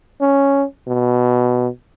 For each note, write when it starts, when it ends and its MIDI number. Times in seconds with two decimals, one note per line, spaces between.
0.21 0.64 61
0.87 1.68 47